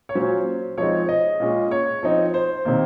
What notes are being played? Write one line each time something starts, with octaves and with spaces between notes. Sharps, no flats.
C#5
A#2 F#3 C#4 C5
F3 G#3 C4 D#4 C#5
D#5
A#2 G#3 C#4
C#5
F3 C4 D#4
C5
C3 D#3 A#3